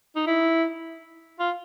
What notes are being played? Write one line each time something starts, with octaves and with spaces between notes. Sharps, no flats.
D#4
E4
F4